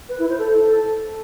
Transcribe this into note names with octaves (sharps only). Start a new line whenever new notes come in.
B4
E4
C5
A4